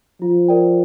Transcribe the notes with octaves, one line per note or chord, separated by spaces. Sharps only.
F3 F4
A#4 D5 G5